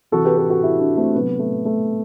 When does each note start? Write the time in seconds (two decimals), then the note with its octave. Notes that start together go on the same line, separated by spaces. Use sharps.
0.12 C3 E3 F#4 A4
0.25 G4 B4
0.37 G4 B4
0.50 F#4 A4
0.63 E4 G4
0.80 D4 F#4
0.97 A3 C4
1.14 C3 F#3 B3
1.39 A3
1.65 A3